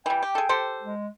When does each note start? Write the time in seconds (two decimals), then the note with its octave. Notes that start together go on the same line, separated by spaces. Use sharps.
0.06 E3 G3 G5
0.22 G4
0.35 G#4 A4
0.49 G4 A4 C5
0.82 G#3